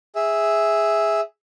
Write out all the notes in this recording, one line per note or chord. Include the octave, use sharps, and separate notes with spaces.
G#4 E5